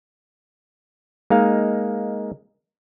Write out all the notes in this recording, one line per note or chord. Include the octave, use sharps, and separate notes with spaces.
G#3 A#3 D#4 F5